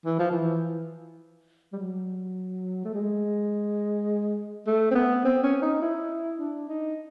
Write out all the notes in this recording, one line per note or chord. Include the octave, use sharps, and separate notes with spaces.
E3
F3
E3
G3
F#3
A3
G#3
A3
C4
B3
C4
C#4
D#4
E4
D4
D#4